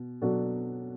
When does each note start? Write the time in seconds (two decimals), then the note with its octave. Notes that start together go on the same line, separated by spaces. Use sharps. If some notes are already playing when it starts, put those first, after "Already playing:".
Already playing: B2
0.22 B2 F#3 D4 F#4 A4